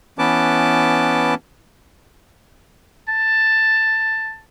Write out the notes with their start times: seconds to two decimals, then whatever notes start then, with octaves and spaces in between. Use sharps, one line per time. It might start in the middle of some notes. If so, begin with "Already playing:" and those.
0.19 E3 B3 C#4 B4 A5 D6
3.09 A5